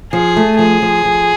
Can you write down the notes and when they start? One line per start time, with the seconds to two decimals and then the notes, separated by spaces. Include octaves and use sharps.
0.13 F3 G#4
0.36 A3
0.58 F3 G#4
0.82 F3
1.05 F3